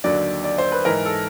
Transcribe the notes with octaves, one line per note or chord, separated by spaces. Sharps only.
D#2 D3 F#3 D5
D5
C5
B4
G#2 E3 A#4
A4